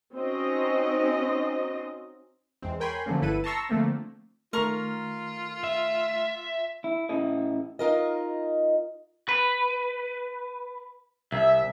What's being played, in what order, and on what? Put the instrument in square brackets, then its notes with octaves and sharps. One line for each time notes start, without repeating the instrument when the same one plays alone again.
[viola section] C4 C#4 D#4 F#4 C5 D#5
[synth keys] E2 G#3 C4
A#4 C#5 G5 G#5 B5 C6
D3 F3 F#3 A3 A#3 C#4
G1 E4 A4 B4 D#7
A5 A#5 C6 C#6 E6 A#6
D3 F3 A3 A#3 C4
[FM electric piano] D#3 A3 [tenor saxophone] F4 [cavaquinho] A#4 A#5 C#6
[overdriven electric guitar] E5
[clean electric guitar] E4
A2 C#4 E4 A4 D#5
[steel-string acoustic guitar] D#4 F4 A#4 D#5
[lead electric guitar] B4
[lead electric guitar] C2 [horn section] E5